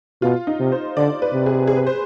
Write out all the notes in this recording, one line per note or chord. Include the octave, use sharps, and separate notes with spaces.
B2 F4
D#4
C3
C5
D3 D5
B4
C3
G#4
G#4
B4
C5